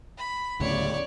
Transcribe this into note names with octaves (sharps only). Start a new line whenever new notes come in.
B5
D2 A2 C#3 C#5 D5